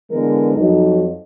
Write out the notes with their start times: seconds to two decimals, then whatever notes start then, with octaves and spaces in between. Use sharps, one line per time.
0.11 D3 E3 G#3 B3 A#4
0.56 F2 F#3 D#4